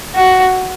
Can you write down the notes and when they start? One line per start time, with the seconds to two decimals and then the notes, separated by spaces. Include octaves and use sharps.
0.15 F#4